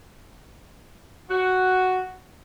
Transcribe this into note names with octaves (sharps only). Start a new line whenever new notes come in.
F#4